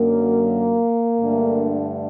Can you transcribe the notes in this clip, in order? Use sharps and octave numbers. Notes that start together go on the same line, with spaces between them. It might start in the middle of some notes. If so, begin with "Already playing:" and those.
Already playing: F#2 D3 F#3 A#3
G2 D3 A3